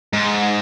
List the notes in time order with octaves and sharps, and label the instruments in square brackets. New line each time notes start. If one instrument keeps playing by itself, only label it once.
[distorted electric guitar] G#2